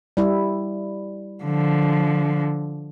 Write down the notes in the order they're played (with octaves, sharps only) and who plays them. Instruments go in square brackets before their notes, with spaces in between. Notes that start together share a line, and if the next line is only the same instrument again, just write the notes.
[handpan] G3 E4
[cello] D3 F3